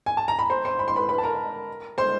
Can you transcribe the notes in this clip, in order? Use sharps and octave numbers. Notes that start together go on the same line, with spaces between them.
G#5
A5
A#5
B5
C5 C6
C5 C6
B5
C6
B4 B5
B4 B5
A5
A#4 A#5
C5 C6